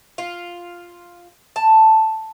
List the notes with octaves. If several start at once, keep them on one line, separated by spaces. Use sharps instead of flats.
F4
A5